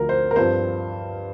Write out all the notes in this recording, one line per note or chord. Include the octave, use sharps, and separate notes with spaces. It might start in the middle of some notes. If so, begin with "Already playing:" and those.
Already playing: D2 D3 F3 A#4
C5
A#4
G2 F3 C4 C5